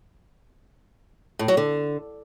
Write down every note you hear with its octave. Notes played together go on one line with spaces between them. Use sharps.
A2
F#3
D3